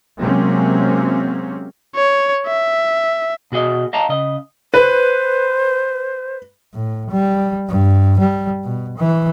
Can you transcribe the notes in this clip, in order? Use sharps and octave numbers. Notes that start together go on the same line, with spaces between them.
C3 F#3 G#3 A#3 C4 C#4
C#5
E5
B2 F#4 G#4 D#5
D#5 F5 A5 A#5
C#3 D#5
B4 C5
A2
G3
G2
G3
B2
E3